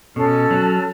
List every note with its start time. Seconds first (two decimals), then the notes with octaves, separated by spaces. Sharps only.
0.16 B2 C#4 A4 F6
0.51 F#3